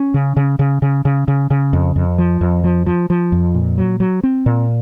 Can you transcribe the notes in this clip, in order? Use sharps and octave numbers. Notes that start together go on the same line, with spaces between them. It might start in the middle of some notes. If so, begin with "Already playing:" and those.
Already playing: C#4
C#3
C#3
C#3
C#3
C#3
C#3
C#3
F2
F2
F3
F2
F3
F3
F3
F2
A#2
F#3
F#3
C4
A#2